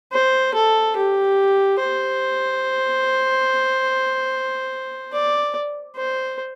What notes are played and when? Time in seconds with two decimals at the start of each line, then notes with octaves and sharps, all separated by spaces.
0.12 C5
0.54 A4
0.96 G4
1.79 C5
5.12 D5
5.96 C5